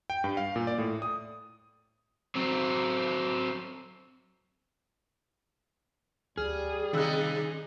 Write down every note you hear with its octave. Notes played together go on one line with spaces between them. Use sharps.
G5
G2
F5
A#2
D5
A2
D#6
F#3 C4
D2 G3 G#4 F6
C3 D#3 D#4 E6 F#6